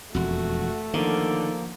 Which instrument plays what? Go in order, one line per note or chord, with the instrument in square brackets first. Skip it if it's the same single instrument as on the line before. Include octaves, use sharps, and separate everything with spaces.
[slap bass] E1 F2 [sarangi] A3 [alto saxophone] F#4
[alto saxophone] D3 [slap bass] D#3 [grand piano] F3 A#3 F5